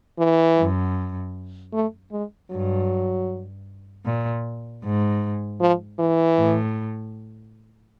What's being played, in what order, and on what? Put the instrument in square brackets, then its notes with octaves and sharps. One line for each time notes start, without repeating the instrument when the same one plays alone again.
[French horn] E3
[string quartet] F#2
[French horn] A3
G#3
[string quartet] G2 [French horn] F#3
[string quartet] A#2
G#2
[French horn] F3
E3
[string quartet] A2